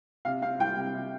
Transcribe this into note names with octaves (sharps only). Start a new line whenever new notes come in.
C3 F5
C4 F5
C2 G5
C3
C3